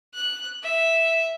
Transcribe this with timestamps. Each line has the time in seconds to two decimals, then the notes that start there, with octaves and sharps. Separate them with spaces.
0.14 F#6
0.63 E5